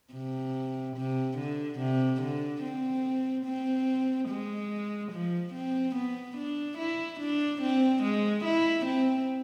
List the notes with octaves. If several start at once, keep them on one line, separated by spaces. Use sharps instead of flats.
C3
C3
D3
C3
D3
C4
C4
G#3
F3
C4
B3
D4
E4
D4
C4
G#3
E4
C4